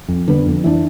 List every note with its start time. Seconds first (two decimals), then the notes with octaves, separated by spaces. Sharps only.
0.08 F2
0.28 D3 G3 B3
0.46 F2
0.64 E3 B3 D4